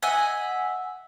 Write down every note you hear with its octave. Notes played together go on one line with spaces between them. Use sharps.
D#5 E5 F#5 G#5